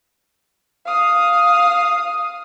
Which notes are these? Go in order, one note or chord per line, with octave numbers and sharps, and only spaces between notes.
F5 D#6